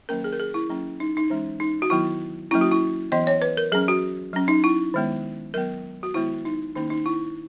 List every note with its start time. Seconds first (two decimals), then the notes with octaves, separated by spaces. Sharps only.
0.09 D#3 F#3 A#3 C#4 A#4
0.24 G#4
0.33 A#4
0.40 G#4
0.54 E4
0.69 F#3 A#3 C#4
1.00 D#4
1.17 D#4
1.30 E3 G#3 C#4
1.60 D#4
1.82 F#4
1.90 D#3 F#3 B3 E4
2.51 F#3 A#3 C#4 E4
2.61 F#4
2.71 E4
3.12 E3 B3 D#5
3.27 C#5
3.42 B4
3.57 A#4
3.72 F#3 C#4 G#4
3.88 F#4
4.33 F#3 C#4
4.48 D#4
4.64 E4
4.94 D#3 G#3 B3
5.54 F#3 B3 A#4
6.03 F#4
6.14 D#3 G#3 B3 E4
6.45 D#4
6.76 D#3 A#3 C#4 D#4
6.90 D#4
7.06 E4